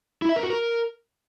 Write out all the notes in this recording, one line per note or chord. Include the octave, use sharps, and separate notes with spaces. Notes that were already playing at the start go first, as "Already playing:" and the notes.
E4
E5
A#4
F#4
A#4